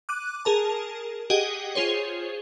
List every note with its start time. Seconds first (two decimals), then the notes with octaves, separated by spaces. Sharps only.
0.09 D6 F#6 D#7
0.45 G#4 A#4 A5
1.30 G4 G#4 D#5 F#5 G5
1.75 F4 G#4 C5 C#5